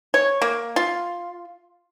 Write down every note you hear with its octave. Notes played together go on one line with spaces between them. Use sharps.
C#5
A#3
F4